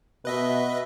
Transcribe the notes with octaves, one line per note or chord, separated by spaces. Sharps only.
B2 B4 D#5 E5